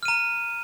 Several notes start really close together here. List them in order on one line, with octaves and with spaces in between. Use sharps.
F6 D#7 A#5